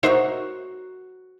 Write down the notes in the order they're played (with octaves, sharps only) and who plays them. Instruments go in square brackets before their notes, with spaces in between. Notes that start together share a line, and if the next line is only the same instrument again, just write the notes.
[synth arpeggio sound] D#4 C5 E5 [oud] F#4 A#4 C#5